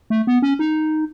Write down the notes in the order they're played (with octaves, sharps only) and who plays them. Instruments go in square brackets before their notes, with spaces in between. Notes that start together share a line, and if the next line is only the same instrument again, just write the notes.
[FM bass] A3
B3
C#4
D#4